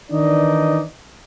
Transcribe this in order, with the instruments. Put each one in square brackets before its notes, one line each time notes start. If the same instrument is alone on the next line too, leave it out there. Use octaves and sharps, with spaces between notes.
[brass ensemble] D#3 E3 D4 D#4 D5 D#5